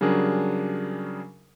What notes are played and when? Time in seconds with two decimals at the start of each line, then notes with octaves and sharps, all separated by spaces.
0.01 C#3 F#3 G3 D4 G#4 A#4